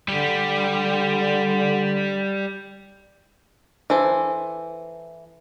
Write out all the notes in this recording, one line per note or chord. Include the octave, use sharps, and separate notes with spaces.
D3 G3 G4
E3 A4 C5